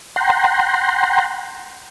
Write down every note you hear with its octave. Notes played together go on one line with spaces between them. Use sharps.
F#5 G5 A#5 C6